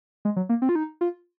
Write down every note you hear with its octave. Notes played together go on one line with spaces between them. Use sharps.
G#3
F#3
A#3
C4
F4
D#4
F4